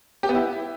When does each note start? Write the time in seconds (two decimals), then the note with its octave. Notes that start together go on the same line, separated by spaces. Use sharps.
0.23 G4
0.29 B3
0.35 E4